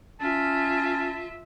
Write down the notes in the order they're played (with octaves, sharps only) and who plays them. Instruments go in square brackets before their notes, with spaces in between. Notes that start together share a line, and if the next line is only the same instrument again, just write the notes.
[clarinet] C#4 [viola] F4 E5 [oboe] A5